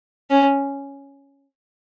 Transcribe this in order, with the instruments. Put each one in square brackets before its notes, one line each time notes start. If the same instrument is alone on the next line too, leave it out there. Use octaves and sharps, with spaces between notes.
[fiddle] C#4